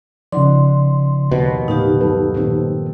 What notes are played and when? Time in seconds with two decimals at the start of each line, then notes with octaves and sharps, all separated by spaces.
0.32 C#3 F3 D#4 D5 F#5 C6
1.31 D#2 B2 B3 D#4 B4
1.68 A2 D3 D#4 G4 A#4 B4 F5
2.01 G2 F#3 C4 A4 B4
2.34 A#2 D#3 C4